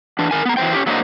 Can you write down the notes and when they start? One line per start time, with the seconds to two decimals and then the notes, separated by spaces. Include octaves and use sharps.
0.19 E3 D4
0.31 D#3 A#4 G#5
0.45 B3 A#5
0.57 E3 F#3 G3 C5 G5
0.73 C#4 D#4 G4
0.86 F#3 A3 A#3 D4 C5 D#5